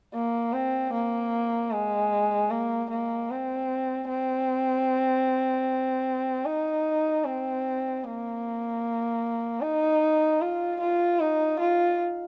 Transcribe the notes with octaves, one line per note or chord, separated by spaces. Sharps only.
A#3
C4
A#3
G#3
A#3
A#3
C4
C4
D#4
C4
A#3
D#4
F4
F4
D#4
F4